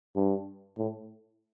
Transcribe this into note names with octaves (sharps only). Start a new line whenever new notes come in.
G2
A2